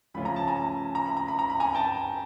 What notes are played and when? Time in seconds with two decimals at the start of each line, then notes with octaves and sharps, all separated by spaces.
0.14 C#3 F3 A3 C#4 F4 B5
0.25 A#5
0.36 A5
0.48 G#5 A#5
0.95 A#5
1.06 B5
1.17 A#5
1.28 B5
1.39 A#5
1.50 B5
1.60 G#5 A#5
1.74 G5 A5